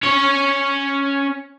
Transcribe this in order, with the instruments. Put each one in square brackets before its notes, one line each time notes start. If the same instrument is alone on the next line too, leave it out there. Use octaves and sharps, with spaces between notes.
[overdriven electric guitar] C#4 C#5